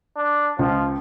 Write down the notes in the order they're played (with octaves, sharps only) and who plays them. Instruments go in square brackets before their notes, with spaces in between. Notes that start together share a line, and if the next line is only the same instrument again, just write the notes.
[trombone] D4
[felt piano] C#2 [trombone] F3